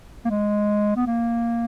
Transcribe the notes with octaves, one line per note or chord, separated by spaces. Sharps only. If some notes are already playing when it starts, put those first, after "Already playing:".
A#3
G#3
B3
A#3